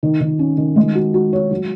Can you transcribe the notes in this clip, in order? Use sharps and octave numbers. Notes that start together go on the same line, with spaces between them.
D#3
D#3
C#4
D#3
G#3
F#4
F#4
C#5
F#3